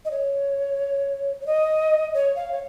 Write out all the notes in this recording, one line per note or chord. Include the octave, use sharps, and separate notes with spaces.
D#5
C#5
C#5
D#5
C#5
F5
C#5